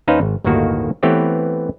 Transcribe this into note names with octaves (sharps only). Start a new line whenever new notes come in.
D#2 C#4 D#4 B4 C5 F5
G#1
G1 D#2 A2 D#3 A#3 F#4
E3 A3 B3 C4 G4 C#5